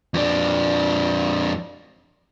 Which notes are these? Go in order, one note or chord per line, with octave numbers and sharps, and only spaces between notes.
F2 D4